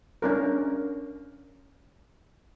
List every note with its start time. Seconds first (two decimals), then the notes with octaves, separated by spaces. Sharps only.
0.22 C#4 D4 A#4